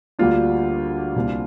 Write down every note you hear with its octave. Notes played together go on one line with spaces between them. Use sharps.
D2 D3 G3 A#3 D4 F4
C2 C3 G3 A#3 D4